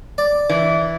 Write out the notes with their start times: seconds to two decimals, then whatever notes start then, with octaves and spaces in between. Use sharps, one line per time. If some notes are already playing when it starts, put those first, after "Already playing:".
0.18 D5
0.49 E3